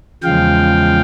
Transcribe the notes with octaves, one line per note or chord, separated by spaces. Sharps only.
E2 C#3 F3 G#3 F5 G5